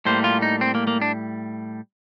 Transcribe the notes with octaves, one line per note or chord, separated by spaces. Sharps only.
A2 G3 A#3 C5
F4
D#4
C4
A#3
A#3
D4